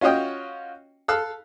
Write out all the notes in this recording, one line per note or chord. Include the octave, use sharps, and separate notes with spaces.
C#4 F4 F#4 C#5 D#5 G5
A4 F5 E6 F#6